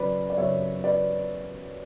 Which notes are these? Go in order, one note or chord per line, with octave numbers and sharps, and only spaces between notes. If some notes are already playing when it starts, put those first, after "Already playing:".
Already playing: F#2 C#3 F#3 B4 D5
D5
F#2 C#3 F#3 C#5 E5
B4 D5